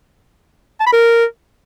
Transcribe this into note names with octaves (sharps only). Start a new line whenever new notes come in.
A5
B5
A#4